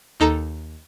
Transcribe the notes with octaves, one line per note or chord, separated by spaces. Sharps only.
D#2 D#4 A4 A#5